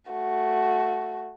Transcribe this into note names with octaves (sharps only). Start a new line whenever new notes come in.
A3 F#4